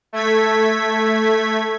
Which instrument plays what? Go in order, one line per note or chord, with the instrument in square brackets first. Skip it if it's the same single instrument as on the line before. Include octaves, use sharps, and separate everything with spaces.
[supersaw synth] A3 G#6 B6